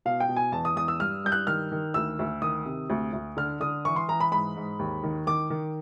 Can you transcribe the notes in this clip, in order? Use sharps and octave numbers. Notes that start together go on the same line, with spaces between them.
B2 F5
G5
B2
G#5
E2 A5
D#6
E2 D#6
E6
G2 F6
G2 G6
F#6
D#3 F6
D#3
D2 E6
D2
D#3 D#6
C3
D2
D2
D3 F6
D3 D#6
E3 C#6
C6
E3 A#5
B5
G#2 B5
G#2
D#2
D#3
D#3 D6
D#3